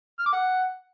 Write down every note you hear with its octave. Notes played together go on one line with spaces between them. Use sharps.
F6
D6
F#5